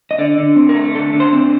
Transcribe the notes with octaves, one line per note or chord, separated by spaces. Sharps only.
D#5
D3 D5
D3
C4
A#4
A3
D3 A4
D3
C5
C4